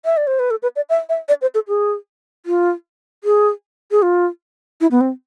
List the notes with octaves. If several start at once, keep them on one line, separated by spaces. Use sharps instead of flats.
E5
D5
C5
B4
A4
B4
D5
E5
E5
D5
C5
A4
G#4
F4
G#4
G#4
F4
E4
B3
C4